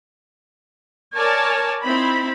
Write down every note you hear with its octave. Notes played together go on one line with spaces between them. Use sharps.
A#4 C#5 D5 G#5 A5
C4 D#4 E4 B5